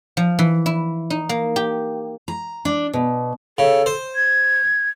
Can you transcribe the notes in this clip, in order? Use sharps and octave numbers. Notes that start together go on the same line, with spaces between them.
F3
E3
E4
D#4
A#3
G4
A#5
D4
B2
C#3 A4
C5
G#6